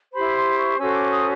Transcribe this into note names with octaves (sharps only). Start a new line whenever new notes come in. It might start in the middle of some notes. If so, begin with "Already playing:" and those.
E4 G4 C5 B5
C6
C#6
C#4 F#4 A4 C5 E6
C#6
D6
D#6